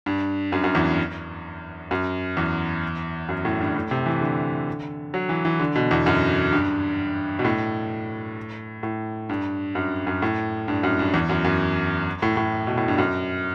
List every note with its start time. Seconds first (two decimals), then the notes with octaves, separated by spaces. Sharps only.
0.06 G2
0.52 F#2
0.64 F#2
0.75 E2
1.91 F#2
2.37 E2
3.29 F#2
3.45 A2
3.60 G2
3.75 A2
3.91 C3
4.06 E3
4.21 D3
5.14 F#3
5.29 E3
5.45 E3
5.60 D3
5.75 B2
5.91 E2
6.06 F#2
6.52 G2
7.39 B2
7.45 A2
8.83 A2
9.29 G2
9.75 F#2
10.07 F#2
10.22 A2
10.68 G2
10.83 F#2
10.99 G2
11.14 E2
11.29 F#2
11.45 F#2
12.22 A2
12.37 A2
12.67 B2
12.78 A2
12.88 G2
12.98 F#2